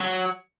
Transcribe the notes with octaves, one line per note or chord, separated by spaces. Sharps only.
F#3